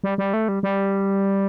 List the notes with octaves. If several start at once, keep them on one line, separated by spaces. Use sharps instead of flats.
G3
G3
A3
G3
G3